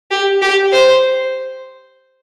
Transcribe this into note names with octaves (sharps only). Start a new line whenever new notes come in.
G4
G4
C5